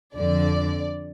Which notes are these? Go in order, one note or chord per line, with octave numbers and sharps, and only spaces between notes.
F2 D3 F3 D5